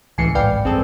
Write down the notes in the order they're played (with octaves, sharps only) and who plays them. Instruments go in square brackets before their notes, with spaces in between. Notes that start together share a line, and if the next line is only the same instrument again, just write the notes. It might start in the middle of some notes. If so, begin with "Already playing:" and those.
[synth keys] C#2 A2 E3 [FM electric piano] G#5 C7 C#7
[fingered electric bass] A1 F2 G#2 [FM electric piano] B4 D5 G5 [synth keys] F5
[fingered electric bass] A#1 G2 [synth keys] C4 G#4 A4